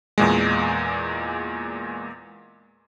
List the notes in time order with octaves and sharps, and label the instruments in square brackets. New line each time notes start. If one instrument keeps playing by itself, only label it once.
[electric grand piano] E2 A#2 G#3